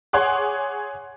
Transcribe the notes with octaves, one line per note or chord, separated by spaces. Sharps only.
G#4 C#5 F#5 C6 D6 F#6